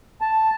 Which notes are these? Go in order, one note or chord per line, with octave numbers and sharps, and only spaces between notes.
A5